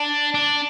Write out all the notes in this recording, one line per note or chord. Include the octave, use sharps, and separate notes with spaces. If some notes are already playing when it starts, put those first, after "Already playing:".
Already playing: D4
D4